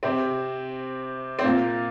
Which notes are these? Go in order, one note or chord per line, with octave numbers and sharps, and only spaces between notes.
C3 C4
C4
A#2 A#3